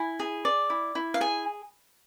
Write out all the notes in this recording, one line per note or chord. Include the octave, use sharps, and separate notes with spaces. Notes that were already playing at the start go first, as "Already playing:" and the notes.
Already playing: E4 G#5
G#4
D5
E4
E4
F5
G#4 G#5